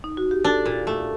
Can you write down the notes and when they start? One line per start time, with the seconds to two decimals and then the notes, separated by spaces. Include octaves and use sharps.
0.04 D#4
0.17 F#4
0.31 G4
0.44 D4 A4
0.65 A#2
0.87 A3